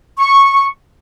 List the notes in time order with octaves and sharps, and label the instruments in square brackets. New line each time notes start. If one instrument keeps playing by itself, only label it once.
[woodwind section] C#6